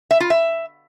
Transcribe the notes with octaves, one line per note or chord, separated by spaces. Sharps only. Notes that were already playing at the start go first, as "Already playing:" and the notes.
E5
F4
E5